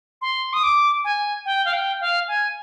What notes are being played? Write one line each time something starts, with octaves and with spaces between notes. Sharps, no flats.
C6
D#6
D6
G#5
G5
F5
G5
F5
G#5